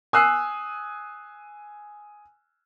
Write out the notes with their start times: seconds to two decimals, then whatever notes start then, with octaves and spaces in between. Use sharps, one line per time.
0.13 G#5 D#6 E6 F#6 C7